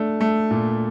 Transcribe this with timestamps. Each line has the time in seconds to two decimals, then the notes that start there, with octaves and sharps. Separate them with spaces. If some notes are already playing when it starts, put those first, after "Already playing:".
Already playing: A3 D4
0.21 A3
0.51 A#2